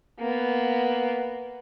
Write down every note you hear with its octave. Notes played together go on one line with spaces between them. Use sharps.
A#3 B3